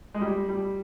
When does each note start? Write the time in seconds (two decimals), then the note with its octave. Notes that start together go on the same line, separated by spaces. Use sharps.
0.14 G#3
0.21 G3
0.49 G3